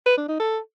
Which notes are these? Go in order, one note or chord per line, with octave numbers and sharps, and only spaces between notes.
B4
D4
D#4
A4